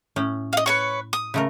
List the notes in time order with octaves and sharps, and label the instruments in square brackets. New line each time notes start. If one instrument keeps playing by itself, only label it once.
[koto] A2 C#4
[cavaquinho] D#5 F5
B4 C#5 C#6
D#6
[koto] C#3 A3 A#4